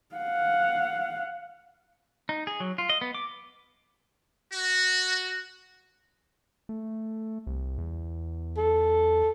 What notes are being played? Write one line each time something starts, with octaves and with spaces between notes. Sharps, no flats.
F5 F#5
D#4
G#4
F#3
F4
D#5
B3
D6
F#4
A3
C2
E2
A4